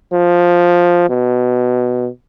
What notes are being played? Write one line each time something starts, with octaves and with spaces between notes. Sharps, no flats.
F3
B2